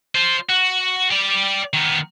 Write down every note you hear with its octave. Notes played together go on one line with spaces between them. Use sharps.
F4 C5
F#4
G4 D5
D#3 B3